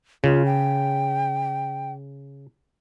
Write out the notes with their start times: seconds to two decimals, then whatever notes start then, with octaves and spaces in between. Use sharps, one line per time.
0.24 C#3 F4
0.46 G5